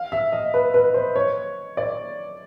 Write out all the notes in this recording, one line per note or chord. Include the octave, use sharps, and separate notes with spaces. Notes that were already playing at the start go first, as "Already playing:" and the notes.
Already playing: F5
E5
D#5
B4
B4
C5
C#5
D5